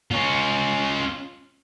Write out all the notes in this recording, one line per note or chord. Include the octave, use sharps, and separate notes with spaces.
C#4 F4